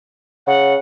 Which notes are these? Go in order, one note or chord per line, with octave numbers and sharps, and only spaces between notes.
C#3 F#5